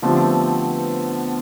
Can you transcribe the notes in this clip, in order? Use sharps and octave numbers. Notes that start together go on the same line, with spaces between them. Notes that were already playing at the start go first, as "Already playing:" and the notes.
D3 F3 A3 B3 C4 G4